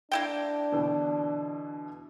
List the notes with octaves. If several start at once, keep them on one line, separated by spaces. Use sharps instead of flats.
A#3 D4 E4 G5
B2 D3 E3